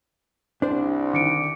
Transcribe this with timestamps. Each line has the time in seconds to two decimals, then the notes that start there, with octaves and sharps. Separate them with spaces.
0.62 C2 D4 C5
1.13 D3 D#3 E4 D6 C#7 D7